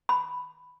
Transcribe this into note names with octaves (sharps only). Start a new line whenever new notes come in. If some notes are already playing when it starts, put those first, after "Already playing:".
B5